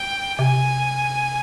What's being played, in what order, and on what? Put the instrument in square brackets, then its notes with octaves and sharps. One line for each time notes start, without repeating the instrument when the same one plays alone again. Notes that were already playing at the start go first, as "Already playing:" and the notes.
Already playing: [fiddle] G5
[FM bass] C3 [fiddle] G#5